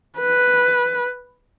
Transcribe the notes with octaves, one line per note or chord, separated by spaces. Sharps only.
B4